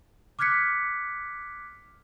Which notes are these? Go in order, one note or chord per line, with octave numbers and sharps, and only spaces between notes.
D6 F6 F#6 G#6 B6 C#7